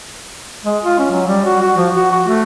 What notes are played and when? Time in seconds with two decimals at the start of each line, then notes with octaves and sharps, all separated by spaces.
0.65 G#3
0.83 F4
0.99 C#4
1.10 F#3
1.27 G3
1.45 F#4
1.61 F#4
1.77 F3
1.96 F#4
2.12 F#4
2.28 A3